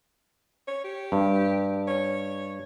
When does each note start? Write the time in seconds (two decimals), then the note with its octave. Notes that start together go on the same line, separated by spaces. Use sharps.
0.68 C#5
0.84 G4
1.12 G2
1.88 C#5